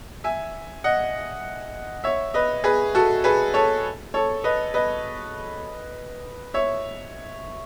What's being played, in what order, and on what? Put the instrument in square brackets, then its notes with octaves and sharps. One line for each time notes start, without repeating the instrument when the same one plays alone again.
[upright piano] E5 G#5
D#5 F#5
C#5 E5
B4 D#5
G#4 B4
F#4 A4
G#4 B4
A4 C#5
A4 C#5
B4 D#5
B4 D#5
C#5 E5